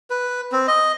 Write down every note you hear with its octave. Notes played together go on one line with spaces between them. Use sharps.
B4
C4
D#5